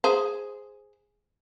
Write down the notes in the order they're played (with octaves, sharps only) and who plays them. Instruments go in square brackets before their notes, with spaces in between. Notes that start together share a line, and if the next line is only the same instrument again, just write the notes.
[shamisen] G#4 C5